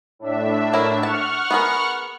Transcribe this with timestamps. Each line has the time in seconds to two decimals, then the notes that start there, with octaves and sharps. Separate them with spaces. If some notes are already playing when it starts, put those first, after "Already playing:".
0.19 A2 D4 E5
0.73 F#3 E4 A#4
1.03 F#5 A5 C#6 F6
1.51 B3 G#4 A#4